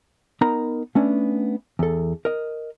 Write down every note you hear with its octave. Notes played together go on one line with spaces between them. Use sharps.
B3 D#4 A#4 A#5 B5
A3 B3 C#4 D4
E2 A4
A#4 D#5